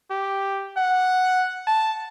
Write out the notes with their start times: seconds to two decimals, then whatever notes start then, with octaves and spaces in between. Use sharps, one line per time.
0.11 G4
0.77 F#5
1.67 A5